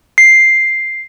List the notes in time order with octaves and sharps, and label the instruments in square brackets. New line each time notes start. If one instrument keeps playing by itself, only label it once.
[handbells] C7